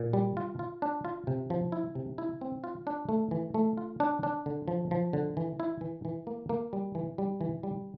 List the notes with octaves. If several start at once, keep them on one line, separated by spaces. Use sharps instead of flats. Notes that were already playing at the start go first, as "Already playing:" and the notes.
Already playing: A#2
G3
F4
F4
D4
F4
C3
F3
E4
C3
E4
C4
F4
D4
A3
E3
A3
F4
D4
D4
D3
F3
F3
D3
E3
E4
E3
E3
A#3
A#3
G3
E3
G3
E3
G3